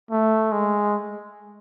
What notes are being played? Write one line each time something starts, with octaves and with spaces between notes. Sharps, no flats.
A3
G#3